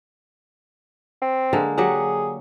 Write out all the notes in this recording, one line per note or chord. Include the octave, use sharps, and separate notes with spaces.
C4
D3 G#3 A#3
F#3 G4 G#4 F#5